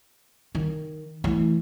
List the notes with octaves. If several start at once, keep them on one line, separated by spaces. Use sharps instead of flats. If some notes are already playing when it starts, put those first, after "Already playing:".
D#3
E3 A3